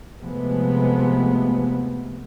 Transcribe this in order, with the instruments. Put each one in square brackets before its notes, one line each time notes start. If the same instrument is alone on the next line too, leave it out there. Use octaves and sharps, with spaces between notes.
[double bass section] C3 F3 G#3 A3 B3